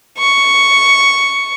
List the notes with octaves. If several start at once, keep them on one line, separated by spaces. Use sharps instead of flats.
C#6